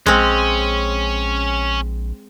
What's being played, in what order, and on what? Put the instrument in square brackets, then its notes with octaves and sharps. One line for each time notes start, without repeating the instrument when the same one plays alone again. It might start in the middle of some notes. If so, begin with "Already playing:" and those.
[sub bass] A#1 [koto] G#3 C4 [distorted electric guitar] C#4